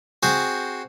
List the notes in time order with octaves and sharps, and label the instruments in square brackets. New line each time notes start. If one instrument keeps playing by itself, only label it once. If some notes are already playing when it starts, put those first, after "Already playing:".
[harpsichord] C4 F#4 G#4 C5